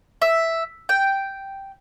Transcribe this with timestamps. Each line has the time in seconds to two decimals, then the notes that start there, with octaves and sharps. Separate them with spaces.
0.22 E5
0.89 G5